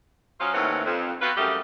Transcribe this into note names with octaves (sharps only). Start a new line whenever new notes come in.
F#3 C#4 F4 C5 D#5 F5
D#2 A2 E3 C4 C#4 F#5
F2
B3 C4 F4 F#4 B4
F#2 G3 A3 G4 D#5 F5